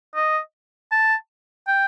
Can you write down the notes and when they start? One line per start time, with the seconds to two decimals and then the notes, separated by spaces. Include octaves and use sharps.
0.15 D#5
0.92 A5
1.67 G5